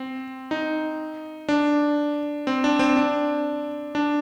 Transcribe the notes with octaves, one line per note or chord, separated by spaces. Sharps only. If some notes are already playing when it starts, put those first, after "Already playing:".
Already playing: C4
D#4
D4
C4
D4
C4
D4
D4